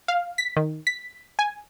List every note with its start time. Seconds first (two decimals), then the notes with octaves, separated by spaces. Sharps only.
0.08 F5
0.38 B6
0.57 D#3
0.87 B6
1.39 G#5